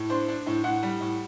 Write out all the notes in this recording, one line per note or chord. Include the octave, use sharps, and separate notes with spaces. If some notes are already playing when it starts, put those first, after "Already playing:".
Already playing: A2
D4 C5
D4
A2
A2 F#5
G3
A2